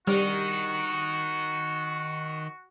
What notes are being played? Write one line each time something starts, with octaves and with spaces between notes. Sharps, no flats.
D#3 G3 D#4 F#4